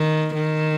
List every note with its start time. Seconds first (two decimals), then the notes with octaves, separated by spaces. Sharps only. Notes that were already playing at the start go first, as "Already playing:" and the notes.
Already playing: D#3
0.34 D#3